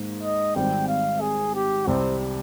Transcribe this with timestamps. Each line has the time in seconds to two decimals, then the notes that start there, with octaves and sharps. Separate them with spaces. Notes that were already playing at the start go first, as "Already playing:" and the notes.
Already playing: G#2 D#3 A#3
0.23 D#5
0.56 G#1 G#2 G3 C4 G5
0.88 F5
1.21 G#4
1.54 G4
1.87 C2 C3 G3 C4